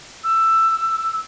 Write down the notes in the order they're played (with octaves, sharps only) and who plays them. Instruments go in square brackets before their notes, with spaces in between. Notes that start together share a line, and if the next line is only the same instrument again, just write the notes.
[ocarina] E6